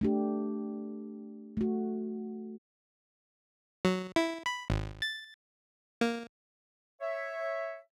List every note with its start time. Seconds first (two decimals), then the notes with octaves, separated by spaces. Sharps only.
0.01 A3 D4 G4
1.57 A3 F#4
3.85 F#3
4.16 E4
4.46 B5
4.70 G#1
5.02 A6
6.01 A#3
7.01 C#5 E5